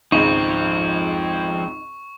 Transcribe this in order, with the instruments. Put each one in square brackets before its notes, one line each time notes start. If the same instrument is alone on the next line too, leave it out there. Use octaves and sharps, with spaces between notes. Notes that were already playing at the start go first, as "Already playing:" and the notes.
[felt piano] G#1 C#2 G#2 [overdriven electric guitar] F3 C4 [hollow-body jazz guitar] D#4 [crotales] C#6